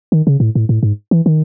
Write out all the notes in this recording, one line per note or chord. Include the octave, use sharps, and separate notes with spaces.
D#3
C#3
A2
A2
A2
G#2
E3
D#3